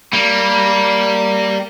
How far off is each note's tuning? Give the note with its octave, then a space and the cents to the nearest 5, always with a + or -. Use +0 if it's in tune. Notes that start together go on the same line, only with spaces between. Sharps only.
G3 -10 A#3 -15